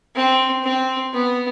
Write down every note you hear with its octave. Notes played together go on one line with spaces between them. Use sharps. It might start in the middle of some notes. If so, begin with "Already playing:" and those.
C4
C4
B3